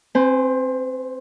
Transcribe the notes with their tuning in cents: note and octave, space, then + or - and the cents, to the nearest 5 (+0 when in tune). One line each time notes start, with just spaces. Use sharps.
C4 +15 C5 -40 G#5 +0